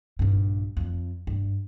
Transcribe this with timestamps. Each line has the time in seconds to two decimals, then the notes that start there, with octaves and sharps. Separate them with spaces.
0.19 A#1 G2
0.77 F2
1.27 G2